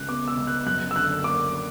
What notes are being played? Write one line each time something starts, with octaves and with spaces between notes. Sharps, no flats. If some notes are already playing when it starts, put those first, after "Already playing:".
Already playing: C#2 C#3 F#6
B3 D6
E6
C#2
F#6
F#2 F#6
E6
D3 F#6
A#3 D6